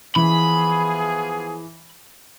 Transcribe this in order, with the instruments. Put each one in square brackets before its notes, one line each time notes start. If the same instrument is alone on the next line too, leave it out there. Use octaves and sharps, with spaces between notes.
[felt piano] E3 [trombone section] F3 B3 G#4 [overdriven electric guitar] B5